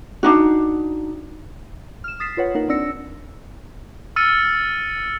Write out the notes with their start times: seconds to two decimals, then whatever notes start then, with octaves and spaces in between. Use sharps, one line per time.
0.23 D4 D#4 F#4
2.04 F6 E7
2.20 D#6 A6 B6 C7 E7
2.37 F4 B4 C#5 F#5
2.55 A#3 D#4 A#4 F#5
2.69 C4 D4 D5 E6 A#6 C#7
4.16 E6 F6 A6 C#7 D#7